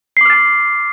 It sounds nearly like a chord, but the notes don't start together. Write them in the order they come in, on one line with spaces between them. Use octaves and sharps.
C7 D6 F6 A6